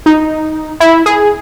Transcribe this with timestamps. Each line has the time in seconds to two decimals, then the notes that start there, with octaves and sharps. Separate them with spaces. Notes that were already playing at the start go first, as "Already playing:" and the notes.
0.06 D#4
0.80 E4
1.06 G#4